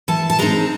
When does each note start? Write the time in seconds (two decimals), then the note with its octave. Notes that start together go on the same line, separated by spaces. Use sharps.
0.08 E3 A5
0.30 A5
0.39 G#3 C4 D#4 A#5